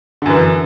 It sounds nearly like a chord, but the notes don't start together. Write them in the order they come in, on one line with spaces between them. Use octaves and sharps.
D3 F#2 E3